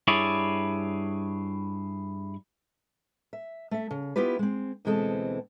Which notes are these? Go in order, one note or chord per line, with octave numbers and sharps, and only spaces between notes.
G2 E4 G#4 C#5 D5
E5
A3 E5
C#3
B3 E4 F4 G4 B4
G#3 C4
D2 B2 E3 G#3 C4 A4